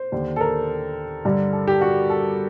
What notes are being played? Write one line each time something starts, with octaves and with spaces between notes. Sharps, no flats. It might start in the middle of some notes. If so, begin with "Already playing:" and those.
Already playing: C5
D#2 D3
A4
A#4
G2 D3
A4
G4
F#4
A4